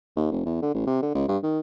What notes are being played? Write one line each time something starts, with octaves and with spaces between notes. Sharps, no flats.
D#2
F1
E2
D3
A1
C3
D3
C#2
G2
D#3